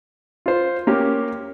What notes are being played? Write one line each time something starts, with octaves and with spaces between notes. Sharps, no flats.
F4 C5
A#3 C#4 G4